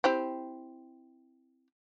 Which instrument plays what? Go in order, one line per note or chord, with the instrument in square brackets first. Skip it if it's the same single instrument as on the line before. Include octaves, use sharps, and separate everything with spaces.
[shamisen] C4 E4 G4